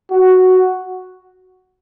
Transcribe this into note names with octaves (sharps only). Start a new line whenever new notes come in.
F#4